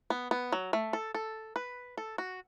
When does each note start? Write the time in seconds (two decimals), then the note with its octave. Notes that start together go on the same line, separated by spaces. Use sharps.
0.10 B3
0.31 B3
0.52 F#3
0.73 A3
0.93 A4
1.14 A4
1.56 B4
1.97 A4
2.18 F#4